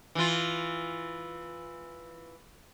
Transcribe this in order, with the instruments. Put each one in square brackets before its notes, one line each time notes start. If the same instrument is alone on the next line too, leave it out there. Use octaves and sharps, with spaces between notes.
[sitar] E3 F4